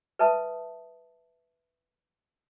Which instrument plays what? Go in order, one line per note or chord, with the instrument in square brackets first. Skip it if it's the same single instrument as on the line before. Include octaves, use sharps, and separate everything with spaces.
[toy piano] B4 E5 A5 D#6